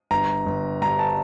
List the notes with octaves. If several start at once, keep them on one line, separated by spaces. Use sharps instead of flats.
G1 A#5
G1
G2 A#5
A5